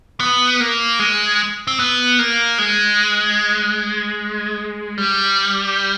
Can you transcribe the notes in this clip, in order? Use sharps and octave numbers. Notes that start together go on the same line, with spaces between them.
B3
A#3
G#3
C4
B3
A#3
G#3
G3